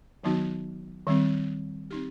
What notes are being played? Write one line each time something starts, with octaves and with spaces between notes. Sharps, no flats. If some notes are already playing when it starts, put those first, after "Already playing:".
D#3 F#3 B3 D#4 F#4
D#3 G3 C4
C4 D#4 G4